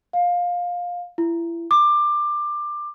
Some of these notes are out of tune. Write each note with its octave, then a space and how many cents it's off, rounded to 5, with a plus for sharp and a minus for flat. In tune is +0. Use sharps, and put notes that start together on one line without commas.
F5 +20
E4 +30
D6 +20